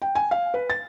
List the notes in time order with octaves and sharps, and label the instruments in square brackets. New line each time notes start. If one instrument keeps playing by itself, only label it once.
[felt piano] G5
G#5
F5
B4
A6